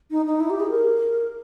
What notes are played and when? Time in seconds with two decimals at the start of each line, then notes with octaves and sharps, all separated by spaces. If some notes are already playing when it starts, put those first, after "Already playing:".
0.11 D#4
0.26 D#4
0.40 E4
0.50 G4
0.60 G#4
0.70 A#4